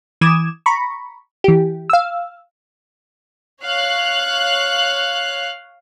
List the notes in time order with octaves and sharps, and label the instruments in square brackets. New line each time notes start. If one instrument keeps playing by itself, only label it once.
[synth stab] E3 D6 D#6 G#6 E7
A#5 B5 C#6
E3 G4
F5 E6
[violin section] C#5 F5 F#6